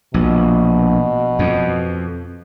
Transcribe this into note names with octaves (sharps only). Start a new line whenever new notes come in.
A#1 B2
F2